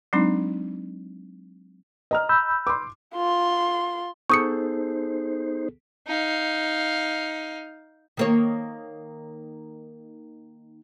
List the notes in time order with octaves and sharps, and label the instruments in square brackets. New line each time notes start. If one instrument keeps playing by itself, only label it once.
[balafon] F#3 G#3 C4 D4 D#4
[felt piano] D#5 A#5 F6
[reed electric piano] B5 E6 G6
[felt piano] C6 D6
[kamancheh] F4 C6
[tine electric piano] B3 G#4 A4 [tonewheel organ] D#4 C5 [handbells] C#6 D#6 C#7
[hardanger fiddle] D#4 F5
[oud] D#3 A#3 C#5